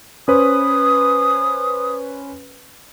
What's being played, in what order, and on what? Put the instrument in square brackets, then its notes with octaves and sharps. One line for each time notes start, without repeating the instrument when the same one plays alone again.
[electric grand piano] C#4 B4 C5 [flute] D#6